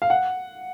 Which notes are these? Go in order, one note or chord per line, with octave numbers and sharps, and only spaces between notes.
F5
F#5